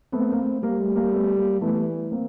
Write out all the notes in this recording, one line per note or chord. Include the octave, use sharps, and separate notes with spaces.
A3 B3 C4
A#3
A3
G3 A#3
A3
A#3
A3 B3
A#3
E3 A3 B3
A#3 C4